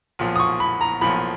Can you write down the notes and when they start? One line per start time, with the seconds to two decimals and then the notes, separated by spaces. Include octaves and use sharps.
0.19 B1 A#2 F3
0.36 D#6
0.40 C#6
0.60 B5
0.81 A#5
1.01 B1 A#2 F3 B5